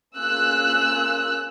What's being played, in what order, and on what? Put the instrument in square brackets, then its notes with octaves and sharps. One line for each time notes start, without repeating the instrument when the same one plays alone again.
[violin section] A#3 C#4 F4 G#4 E6 F#6